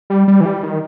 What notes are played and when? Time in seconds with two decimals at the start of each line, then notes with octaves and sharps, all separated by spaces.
0.10 G3
0.28 G3
0.41 E3
0.46 G3
0.63 D#3